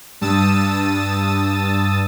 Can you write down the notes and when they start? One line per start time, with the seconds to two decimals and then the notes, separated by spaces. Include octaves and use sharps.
0.21 G2 A5 D#6 E6 A6